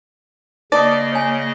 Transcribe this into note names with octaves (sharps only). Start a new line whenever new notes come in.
C#3 A#3 D#4 D5 D#5 D#6
C#5 G#5